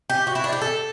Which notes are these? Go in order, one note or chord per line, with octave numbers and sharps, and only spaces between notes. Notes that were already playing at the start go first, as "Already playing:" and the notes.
G4
F#4
E4
D4
G4
A4